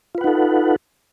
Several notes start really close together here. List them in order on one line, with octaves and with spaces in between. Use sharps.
F4 B4 F#5 D#4 A4